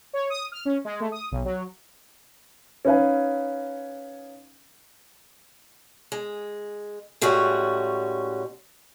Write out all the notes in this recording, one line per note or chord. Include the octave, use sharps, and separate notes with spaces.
C#5
D#6
F6
C#4
G#3
A3
D#6
B1
F#3
C#4 D#4 B4 F5 G#5
G#3
A2 G3 G#3 C#4 F#4